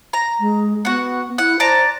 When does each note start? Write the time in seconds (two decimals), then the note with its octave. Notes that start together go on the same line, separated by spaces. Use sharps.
0.13 A#5
0.40 G#3
0.85 B3 F#4 F#5
1.38 E4 F#5
1.60 C5 D5 A5 A#5